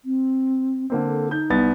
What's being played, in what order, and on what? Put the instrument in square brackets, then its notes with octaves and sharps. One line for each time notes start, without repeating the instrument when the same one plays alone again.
[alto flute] C4
[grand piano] D3 A#3 C4
[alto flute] A4
[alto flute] D#4 [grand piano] G6
[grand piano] C2 B3 A6